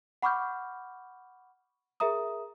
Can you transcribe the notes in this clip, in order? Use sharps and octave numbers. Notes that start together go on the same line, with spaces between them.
F#5 B5 C#6 D6 F6 G6
G#4 A#4 E5 A#5 D#6